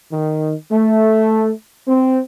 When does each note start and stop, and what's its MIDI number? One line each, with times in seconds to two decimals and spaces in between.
0.11 0.53 51
0.70 1.51 57
1.87 2.18 60